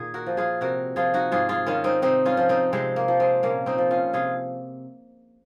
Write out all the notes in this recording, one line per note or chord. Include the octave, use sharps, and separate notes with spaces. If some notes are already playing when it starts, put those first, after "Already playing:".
Already playing: A#2 D#3 G#4
F#4 A#4
F3
F4 G#4
C3 F#4 A#4
F3 F4 G#4
D#4 F#4
G#2 F4 G#4
F4 G#4
D#3 C#4 F4
C4 D#4
C3 C4 D#4
C#4 F4
F3
C4 D#4
C3 G#3 C4
A#3
F3
G#3 C4
A#2 A#3 C#4
C4 D#4
F3
C#4 F4
C3 F4 G#4